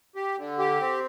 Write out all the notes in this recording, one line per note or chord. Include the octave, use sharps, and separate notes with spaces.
G4
D3
G4
C4